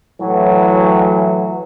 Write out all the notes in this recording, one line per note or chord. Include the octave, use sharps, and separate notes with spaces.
A2 E3 F#3